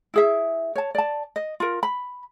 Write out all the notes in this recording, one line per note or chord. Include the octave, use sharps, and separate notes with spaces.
E4 G#4 E5
C#5 A5
D5 A5
D#5
F4 A#4
B5